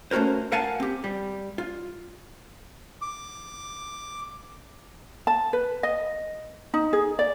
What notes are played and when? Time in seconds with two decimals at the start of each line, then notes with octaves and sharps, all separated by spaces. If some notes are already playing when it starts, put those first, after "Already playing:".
0.11 A3 C#4 F#4 A#4 C5
0.52 A#4 F5 F#5 G#5 A5
0.80 C4 G4
1.04 G3
1.58 F4
3.02 D6
5.27 A5
5.53 B4
5.83 D#5
6.74 D#4
6.93 G#4
7.19 D5